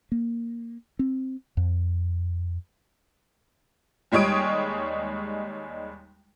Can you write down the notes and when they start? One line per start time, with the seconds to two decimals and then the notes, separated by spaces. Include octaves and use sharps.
0.12 A#3
0.99 C4
1.57 F2
4.12 D#2 G3 G#3 C#5 D#6 D7